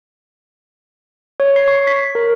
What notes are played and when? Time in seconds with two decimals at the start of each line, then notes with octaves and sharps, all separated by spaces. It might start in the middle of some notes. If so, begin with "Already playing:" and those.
1.40 C#5
1.56 C7
1.68 C#6
1.87 B6
2.15 A#4